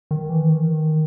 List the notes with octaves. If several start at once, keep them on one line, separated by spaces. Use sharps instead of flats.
D#3
E3
D#3